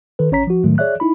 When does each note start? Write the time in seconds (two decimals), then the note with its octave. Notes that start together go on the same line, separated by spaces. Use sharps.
0.19 D#3 A4 B4
0.31 A1 C#4 C#5 A#5 B6
0.47 F3 F#4
0.64 A2 D#3 F#3 A3
0.78 G#4 C#5 D5 E5 F#6
1.00 D#4 E4 B5